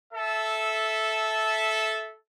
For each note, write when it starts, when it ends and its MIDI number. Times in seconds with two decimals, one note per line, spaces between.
0.12 2.13 69
0.12 2.13 76